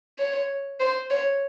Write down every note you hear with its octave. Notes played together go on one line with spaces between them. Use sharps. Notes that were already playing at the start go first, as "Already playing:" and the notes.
C#5
C5
C#5